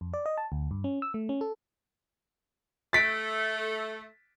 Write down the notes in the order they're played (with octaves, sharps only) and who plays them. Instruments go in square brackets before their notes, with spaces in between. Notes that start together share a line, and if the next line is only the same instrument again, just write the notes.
[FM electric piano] F2
D5
D#5
A5
D2
G2
C#4
E6
A3
C#4
A4
[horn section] A3 [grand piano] A6 B6 D7